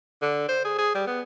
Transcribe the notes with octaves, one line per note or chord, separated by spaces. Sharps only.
D3
C5
G#4
G#4
G3
B3